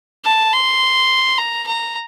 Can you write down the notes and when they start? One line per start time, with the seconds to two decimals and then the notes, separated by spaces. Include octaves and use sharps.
0.25 A5
0.53 C6
1.38 A#5
1.67 A#5